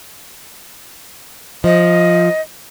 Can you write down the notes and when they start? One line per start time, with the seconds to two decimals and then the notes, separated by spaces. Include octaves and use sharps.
1.64 F3 D#5